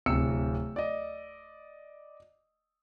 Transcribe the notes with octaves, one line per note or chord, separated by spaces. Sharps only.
D1 C3 E6 C#7
D5 D#5